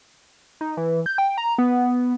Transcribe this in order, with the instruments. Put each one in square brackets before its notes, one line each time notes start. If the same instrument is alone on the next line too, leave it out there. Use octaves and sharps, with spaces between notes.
[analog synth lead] D#4
E3
G6
G5
A#5
B3